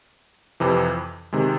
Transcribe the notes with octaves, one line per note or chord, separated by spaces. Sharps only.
F2 C3 E3
C3 D#3 G#3